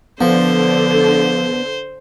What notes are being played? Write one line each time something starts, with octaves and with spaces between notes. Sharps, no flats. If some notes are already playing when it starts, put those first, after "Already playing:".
D3 F3 B3 C5